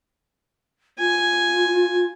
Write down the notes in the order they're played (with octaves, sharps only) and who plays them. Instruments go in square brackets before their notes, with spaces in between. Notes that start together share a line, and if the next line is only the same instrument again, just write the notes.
[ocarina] F4 [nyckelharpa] G#5